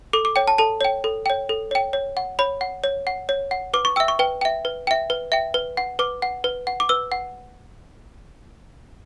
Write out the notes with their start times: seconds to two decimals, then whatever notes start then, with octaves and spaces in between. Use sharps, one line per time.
0.13 A4 D6
0.25 D6
0.36 C#5 G5
0.48 A5
0.58 A4 A5
0.81 C#5 G5
1.04 A4
1.26 C#5 G5
1.49 A4
1.71 C#5 G5
1.93 C#5
2.17 F#5
2.39 C#5 B5
2.61 F#5
2.84 C#5
3.07 F#5
3.29 C#5
3.51 F#5
3.74 B4 D6
3.85 C#6
3.96 E5 G5 E6
4.08 C#6
4.19 B4 G5
4.41 E5 G5
4.65 B4
4.87 E5 G5
5.10 B4
5.32 E5 G5
5.54 B4
5.77 F#5
5.99 B4 D6
6.22 F#5
6.44 B4
6.67 F#5
6.80 D6
6.89 B4 E6
7.12 F#5